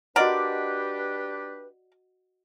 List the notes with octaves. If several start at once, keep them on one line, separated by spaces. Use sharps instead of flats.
D4 F#4 G4 A#4 B4 D5 D#5 F#5